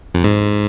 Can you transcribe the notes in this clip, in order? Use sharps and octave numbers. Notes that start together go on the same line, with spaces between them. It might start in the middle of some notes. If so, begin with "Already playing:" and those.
F2
G#2